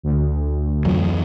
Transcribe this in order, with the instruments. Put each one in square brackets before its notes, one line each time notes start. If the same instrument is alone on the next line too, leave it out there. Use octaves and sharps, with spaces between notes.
[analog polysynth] D2
[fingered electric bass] F2 E3 F#3